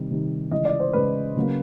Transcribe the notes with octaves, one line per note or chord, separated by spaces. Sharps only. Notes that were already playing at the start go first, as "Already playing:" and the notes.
Already playing: C3 D#3 G3
C3 D#3 G3
C#3 E3 G#3 D#5
D5
C5
C#3 E3 G#3 B4
C#3 F#3 A#3